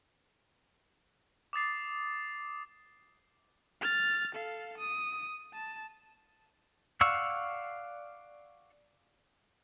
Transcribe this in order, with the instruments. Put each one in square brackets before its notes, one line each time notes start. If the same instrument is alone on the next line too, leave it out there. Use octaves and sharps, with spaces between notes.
[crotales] D6 D#6 A6 C7
[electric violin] F6 A6
A4 F5
D#6
A5
[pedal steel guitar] D5 F5 F#5 C#6 E6